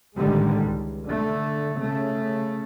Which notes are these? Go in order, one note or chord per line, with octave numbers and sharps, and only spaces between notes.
A1 D3 D#3 G3 G#3
C#2
D3 A3
C#3 A3